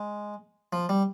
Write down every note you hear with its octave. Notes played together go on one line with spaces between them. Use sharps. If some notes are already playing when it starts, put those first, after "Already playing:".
Already playing: G#3
F3
G3